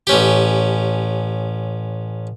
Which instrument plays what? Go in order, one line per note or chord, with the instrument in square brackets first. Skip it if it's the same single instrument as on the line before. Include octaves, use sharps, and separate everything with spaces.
[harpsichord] A1 C#4 G4